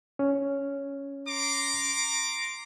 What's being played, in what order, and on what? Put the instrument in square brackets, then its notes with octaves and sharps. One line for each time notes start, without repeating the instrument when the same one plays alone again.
[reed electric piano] C#4
[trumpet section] A#5 C6 D6